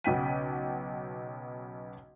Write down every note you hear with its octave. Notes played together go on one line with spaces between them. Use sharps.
B1 C#3 F#5 G5 B6 D#7